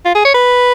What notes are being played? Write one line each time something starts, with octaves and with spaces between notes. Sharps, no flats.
F4
G#4
C#5
B4